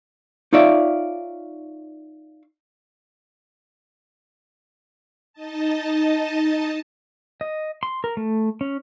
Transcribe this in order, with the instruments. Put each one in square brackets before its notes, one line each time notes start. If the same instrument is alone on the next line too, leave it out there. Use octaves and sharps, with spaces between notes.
[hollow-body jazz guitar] D#4 F4 C#5 D5 E5 F5
[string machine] D#4 D#5 A5
[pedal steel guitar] D#5
C6
A#4
A3
C#4